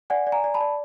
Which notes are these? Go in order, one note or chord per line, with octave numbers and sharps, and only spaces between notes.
D5 F#5 G#5
D5
G#5 A#5
D5
A5 B5
D5